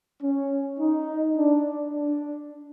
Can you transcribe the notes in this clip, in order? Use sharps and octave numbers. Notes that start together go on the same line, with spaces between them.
C#4
D#4
D4
D4